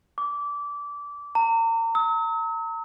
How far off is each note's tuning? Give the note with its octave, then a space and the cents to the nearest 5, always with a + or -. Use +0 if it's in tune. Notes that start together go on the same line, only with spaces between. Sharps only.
D6 -20
A#5 -40
E6 -45